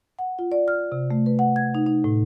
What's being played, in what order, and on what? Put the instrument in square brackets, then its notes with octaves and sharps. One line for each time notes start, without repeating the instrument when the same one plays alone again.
[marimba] F#5
F4
D5
F6
C3
A3
B4
F#5
G#6
D#4
D#4
A2